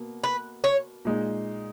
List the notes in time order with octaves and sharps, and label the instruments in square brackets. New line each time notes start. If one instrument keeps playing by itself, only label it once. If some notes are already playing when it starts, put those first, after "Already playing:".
Already playing: [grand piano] B2 A#3
[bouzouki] B4
C#5
[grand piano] A#2 G#3 D#4